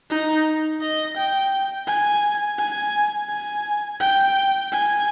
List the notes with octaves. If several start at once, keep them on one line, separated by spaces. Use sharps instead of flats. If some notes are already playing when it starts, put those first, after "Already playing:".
D#4
D#5
G5
G#5
G#5
G#5
G5
G#5